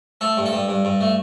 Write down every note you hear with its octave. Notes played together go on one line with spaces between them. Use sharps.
A3 A4
G2
A4
G2
G2
G2
A3